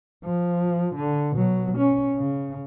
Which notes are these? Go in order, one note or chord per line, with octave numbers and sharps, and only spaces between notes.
F3
D3
B2 F#3
C#4
C#3